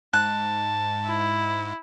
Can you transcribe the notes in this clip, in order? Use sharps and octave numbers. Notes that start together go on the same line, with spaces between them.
G#2 A5 F#6
E4